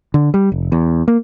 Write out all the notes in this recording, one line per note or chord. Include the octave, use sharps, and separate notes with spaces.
D3
G3
F1
E2
A#3